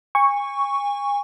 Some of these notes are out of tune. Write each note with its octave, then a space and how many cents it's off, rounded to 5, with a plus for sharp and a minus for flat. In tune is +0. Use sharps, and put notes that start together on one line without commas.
G#5 -35 C#6 +0